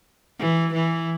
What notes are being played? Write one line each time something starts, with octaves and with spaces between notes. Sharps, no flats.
E3
E3